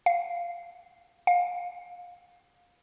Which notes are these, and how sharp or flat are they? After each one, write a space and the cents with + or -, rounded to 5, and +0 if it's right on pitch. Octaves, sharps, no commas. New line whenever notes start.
F5 -15
F5 +25